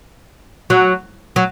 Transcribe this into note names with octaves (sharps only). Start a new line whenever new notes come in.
F#3
F#3